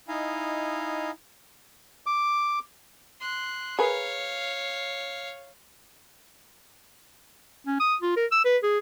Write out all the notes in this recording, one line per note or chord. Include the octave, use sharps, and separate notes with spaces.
D#4 E4 D#5 F5 G#5
D6
C6 F#6
G#4 A#4 B4 C#5 F5
C#4
D#6
F4
A#4
E6
B4
G#4